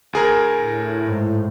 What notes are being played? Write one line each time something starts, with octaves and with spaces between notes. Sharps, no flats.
D2 G#4 A#4
A2
G#2